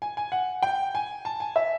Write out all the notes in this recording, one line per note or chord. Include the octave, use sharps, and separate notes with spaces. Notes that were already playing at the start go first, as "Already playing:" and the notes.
G#5
G#5
F#5
G5
G#5
A5
G#5
E5